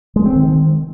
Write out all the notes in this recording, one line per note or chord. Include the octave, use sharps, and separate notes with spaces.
G#3
C4
D#3